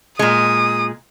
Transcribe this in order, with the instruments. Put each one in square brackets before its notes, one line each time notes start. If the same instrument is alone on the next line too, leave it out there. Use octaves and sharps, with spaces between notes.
[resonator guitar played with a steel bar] A#2 G#3 [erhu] D#6